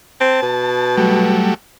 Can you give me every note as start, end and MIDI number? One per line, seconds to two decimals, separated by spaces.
0.20 0.40 60
0.20 0.96 81
0.42 1.41 47
0.97 1.54 54
0.97 1.54 55
0.97 1.54 57